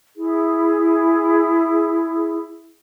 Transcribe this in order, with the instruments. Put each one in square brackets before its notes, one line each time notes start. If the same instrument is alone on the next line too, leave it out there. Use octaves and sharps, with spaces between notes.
[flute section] E4 G#4